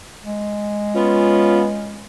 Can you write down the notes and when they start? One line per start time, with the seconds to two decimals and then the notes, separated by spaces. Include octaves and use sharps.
0.24 G#3
0.95 B3 C#4 F4